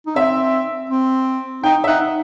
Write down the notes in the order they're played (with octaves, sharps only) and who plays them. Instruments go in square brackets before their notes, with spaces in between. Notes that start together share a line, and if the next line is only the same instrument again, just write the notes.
[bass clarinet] D#4
[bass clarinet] C4 [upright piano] E5
[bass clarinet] C4
[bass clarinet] D#4 [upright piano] G5
[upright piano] E5
[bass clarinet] D#4 [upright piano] F#5